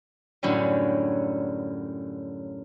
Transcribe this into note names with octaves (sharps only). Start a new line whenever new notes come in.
F#2 A2 D3 F#3 G3